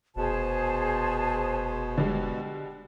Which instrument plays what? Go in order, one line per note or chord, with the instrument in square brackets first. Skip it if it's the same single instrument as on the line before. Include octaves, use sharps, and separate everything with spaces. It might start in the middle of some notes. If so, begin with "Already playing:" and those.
[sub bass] F1 [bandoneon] B2 [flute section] G#4 C5 A5
[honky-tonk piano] D3 G3 G#3